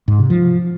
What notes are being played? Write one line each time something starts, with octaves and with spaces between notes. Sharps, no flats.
G#2
C3
F3